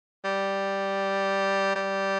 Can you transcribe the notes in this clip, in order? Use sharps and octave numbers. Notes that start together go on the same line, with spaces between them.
G3
G3